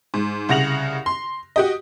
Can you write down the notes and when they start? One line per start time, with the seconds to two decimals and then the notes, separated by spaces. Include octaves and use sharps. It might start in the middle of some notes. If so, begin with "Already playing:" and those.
0.14 G#2
0.49 C2 C#3 F#5 A#6 F7 F#7
1.06 C6
1.56 F#4 G4 D#5